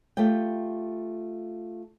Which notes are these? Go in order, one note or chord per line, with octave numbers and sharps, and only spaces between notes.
A3 F4 G4 G5